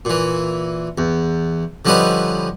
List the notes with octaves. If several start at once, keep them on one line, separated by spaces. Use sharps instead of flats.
A#2 E3
E2
D3 F3 G3 C#4 D#4 B4